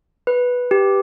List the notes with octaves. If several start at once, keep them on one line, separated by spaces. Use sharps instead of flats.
B4
G4